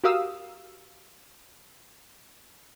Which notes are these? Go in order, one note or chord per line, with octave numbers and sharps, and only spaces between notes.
F#4 G4 A#4 F5 D#6 E6